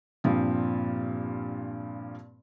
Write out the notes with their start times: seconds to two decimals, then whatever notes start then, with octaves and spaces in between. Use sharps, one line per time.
0.24 G2 A#2 F3 C4